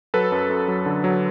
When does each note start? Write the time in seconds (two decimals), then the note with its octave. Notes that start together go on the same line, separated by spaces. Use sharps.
0.14 F#3 A4 B4
0.32 F#2
0.50 F#2
0.68 F#3
0.86 D3
1.04 F#3